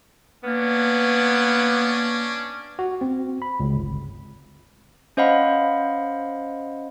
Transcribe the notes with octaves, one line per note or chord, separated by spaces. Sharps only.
A#3 B3 C#4 D4
F#4
C4
B5
C#2
G1
C#4 C5 D#5 F5 F#5 B5